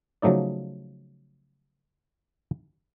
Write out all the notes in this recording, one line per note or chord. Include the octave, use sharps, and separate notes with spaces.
C#3 F3 F#3 A3 D#4 D5